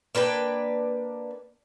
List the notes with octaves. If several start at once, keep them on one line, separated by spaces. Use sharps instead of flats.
A#3 D4 B4 G5